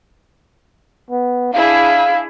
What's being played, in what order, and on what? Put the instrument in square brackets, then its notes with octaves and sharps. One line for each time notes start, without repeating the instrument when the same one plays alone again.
[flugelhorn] B3
[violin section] D4 E4 G#4 [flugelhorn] F5